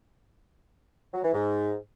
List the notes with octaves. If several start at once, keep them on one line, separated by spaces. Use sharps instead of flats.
F#3
E3
G#2